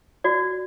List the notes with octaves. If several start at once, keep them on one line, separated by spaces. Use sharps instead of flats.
F#4 D5